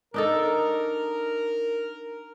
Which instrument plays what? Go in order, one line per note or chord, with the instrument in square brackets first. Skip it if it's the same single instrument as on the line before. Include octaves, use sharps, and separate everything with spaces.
[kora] D4 D#4 A4 [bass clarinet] A#4